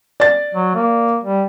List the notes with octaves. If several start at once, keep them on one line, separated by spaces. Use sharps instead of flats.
D5 A6
F#3
A#3
G3